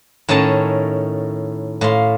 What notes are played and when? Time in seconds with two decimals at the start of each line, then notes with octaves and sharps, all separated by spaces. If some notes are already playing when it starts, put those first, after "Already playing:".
0.29 A2 D#3 C#4 A4 A5
1.81 A2 F5 C6